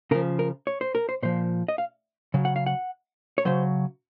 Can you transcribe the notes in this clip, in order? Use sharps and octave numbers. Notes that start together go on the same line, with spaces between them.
C#3 F3 A#4
A#4
C#5
C5
A#4
C5
A#2 F3 C5
D#5
F5
C#3 F#3
F#5
F5
F#5
C#5
C#3 F#3 C5